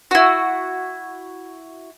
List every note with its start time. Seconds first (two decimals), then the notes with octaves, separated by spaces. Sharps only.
0.11 E4 F#4